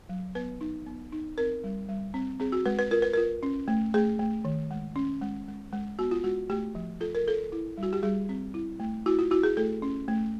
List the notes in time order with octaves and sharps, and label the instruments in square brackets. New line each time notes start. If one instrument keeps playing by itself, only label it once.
[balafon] F#3
B3 B4
D#4
B3
D#4
C4 A#4
G3
G3
C4
C4 G#4
F#4
G#3 B4
B4
F4 A#4
B4
F4 A#4
C#4
A3
A3 G#4
A3
D#3
G#3
C#4
G#3
G#3
G#3
B3 F#4
F4
G#3 F#4
A3 G4
F3
F4 A4
A#4
F4 A4
E4
G3
F#4
G4
G3 G#4
C4
E4
A3
E4 F#4
F4
E4 F#4
G#4
A3 A4
C#4
A3